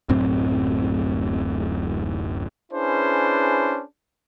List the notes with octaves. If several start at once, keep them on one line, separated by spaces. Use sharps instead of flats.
D1 F#2 A2 C4
C#4 D4 E4 G#4 B4 C5